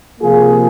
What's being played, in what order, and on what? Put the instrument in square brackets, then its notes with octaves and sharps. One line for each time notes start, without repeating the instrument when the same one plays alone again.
[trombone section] C3 F3 A#3 F4 G#4